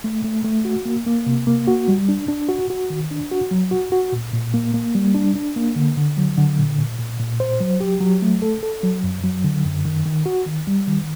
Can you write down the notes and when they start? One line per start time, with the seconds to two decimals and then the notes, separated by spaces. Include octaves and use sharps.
0.04 A3
0.24 A3
0.44 A3
0.65 F#4
0.85 A#3
1.06 A#3
1.26 C3
1.47 A#3
1.67 F#4
1.88 G3
2.09 D4
2.28 D4
2.49 F#4
2.70 F#4
2.90 D#3
3.11 D4
3.31 F#4
3.51 F#3
3.71 F#4
3.92 F#4
4.12 A#2
4.33 A#2
4.54 A#3
4.74 A#3
4.95 G3
5.14 D4
5.35 D4
5.56 A#3
5.76 D3
5.97 D3
6.17 F#3
6.37 D3
6.58 A#2
6.78 A#2
6.99 A#2
7.19 A#2
7.40 C5
7.61 F#3
7.80 G4
8.01 F#3
8.22 A3
8.42 A4
8.63 A4
8.83 F#3
9.03 F#2
9.24 F#3
9.44 D3
9.65 F#2
9.85 D#3
10.06 D#3
10.26 F#4
10.46 D#3
10.67 G3
10.87 D#3